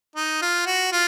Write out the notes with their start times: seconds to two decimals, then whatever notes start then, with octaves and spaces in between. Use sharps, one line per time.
0.16 D#4
0.41 F4
0.66 F#4
0.92 F4